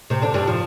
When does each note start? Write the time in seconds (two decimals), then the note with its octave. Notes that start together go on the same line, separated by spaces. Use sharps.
0.10 C3 C4
0.22 D3 D4
0.34 G2 G3
0.47 F3